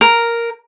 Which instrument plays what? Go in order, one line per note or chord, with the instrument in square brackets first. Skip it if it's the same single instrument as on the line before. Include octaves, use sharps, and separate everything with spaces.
[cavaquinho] A#4